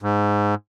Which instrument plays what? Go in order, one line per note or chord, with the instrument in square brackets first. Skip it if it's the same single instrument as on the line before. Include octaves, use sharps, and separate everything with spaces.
[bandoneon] G#2